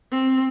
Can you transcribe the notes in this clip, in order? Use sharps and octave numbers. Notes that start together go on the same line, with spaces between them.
C4